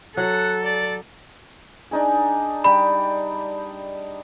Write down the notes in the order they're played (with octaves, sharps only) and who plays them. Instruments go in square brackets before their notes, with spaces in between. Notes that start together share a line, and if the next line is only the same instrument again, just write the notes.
[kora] F#3 [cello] A4 [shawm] F#5
[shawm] D5
[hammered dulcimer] D4 D#4 G#4
[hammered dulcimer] G3 G5 [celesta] B5